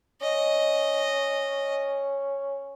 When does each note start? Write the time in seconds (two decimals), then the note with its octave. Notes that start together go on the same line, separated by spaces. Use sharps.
0.21 C#4 D#5